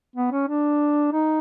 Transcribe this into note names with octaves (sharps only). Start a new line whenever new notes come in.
B3
C#4
D4
D#4